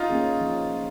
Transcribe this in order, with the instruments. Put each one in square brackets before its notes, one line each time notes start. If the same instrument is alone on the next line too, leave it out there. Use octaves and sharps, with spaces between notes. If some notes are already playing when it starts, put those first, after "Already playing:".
Already playing: [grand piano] D#4 F4
[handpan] A#3 C#4 G#4
F3